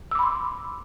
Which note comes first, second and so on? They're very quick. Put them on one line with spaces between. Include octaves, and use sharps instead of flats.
E6 D6 B5 C6